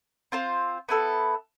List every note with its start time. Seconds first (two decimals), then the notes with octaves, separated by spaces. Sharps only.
0.32 C4 F4 C5
0.89 B3 E4 A4